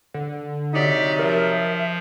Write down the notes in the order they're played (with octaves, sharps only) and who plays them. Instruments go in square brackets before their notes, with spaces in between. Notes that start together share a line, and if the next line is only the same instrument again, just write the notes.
[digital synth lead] D3
[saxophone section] C3 F#3 D#4 [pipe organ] G4 D5 [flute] B6
[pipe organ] F3 [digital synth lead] A#4 [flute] E5